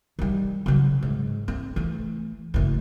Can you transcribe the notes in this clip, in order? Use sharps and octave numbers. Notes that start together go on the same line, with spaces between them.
D#3 G3
C#3 F#3
G#2
C4
E3 A3
F#1 A2